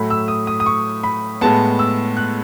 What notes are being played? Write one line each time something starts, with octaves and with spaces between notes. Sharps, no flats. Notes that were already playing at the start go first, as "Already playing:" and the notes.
Already playing: A2 F#3 A3 B5
E6
D#6
D#6
D#6
C#6
B5
A2 G#3 B3 A5
E6
F#6